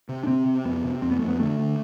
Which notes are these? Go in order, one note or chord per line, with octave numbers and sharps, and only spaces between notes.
C3
D4
C3 C4
C3
F2 B3
C3
F2 C4
B3
F2 A3
B3
D3 A3
D3